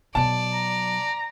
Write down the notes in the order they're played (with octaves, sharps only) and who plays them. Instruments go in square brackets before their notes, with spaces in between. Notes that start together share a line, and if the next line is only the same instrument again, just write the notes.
[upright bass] B2 F#3 [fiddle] D5 [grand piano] A5
[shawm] A#5